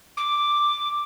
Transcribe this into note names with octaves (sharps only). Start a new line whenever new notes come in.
D6